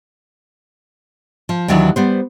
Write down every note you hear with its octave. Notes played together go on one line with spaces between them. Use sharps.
F3
D#2 D#3 E3 F#3 D4
G3 B3 C5